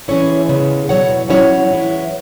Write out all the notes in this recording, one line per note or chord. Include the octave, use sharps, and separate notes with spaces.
E3 C#4 E4 G#4 C#5
C#3 G#3 B3
B2 F#3 E4 C#5 F#5
B2 F#3 C#4 E4 C#5 F#5
E3 G#3 C#4 E4